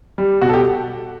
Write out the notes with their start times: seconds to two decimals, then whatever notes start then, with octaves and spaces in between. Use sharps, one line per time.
0.18 G3
0.41 B2 F#4
0.49 A4
0.54 G4